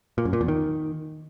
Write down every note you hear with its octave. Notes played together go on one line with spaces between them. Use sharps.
A#2
F#2
A#2
E2
D#3